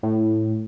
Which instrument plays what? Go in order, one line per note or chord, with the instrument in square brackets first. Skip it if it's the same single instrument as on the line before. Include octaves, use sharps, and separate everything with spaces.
[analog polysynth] A2